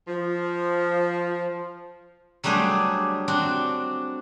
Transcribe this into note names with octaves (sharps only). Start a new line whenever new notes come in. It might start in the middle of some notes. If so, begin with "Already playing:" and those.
F3
F#3 G3 A3 D4 G#4 C5
C4 D4 F#4